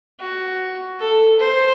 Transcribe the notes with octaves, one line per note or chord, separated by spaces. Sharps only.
F#4
A4
C5